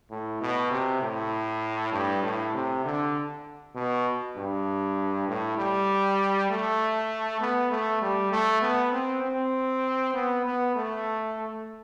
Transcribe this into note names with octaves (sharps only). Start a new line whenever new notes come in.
A2
B2
C3
A2
G2
A2
C3
D3
B2
G2
A2
G3
A3
B3
A3
G3
A3
B3
C4
C4
B3
B3
A3